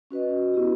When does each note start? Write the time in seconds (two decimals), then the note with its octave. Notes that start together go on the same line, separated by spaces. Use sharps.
0.11 C#4 F#4 B4 D#5
0.54 B3 E4 G4